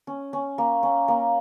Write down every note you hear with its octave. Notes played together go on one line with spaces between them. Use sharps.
C#4
C#4
A#3
C#4
A#3